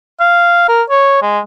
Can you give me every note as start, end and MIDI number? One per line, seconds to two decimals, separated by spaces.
0.20 0.66 77
0.68 0.82 70
0.90 1.21 73
1.22 1.39 56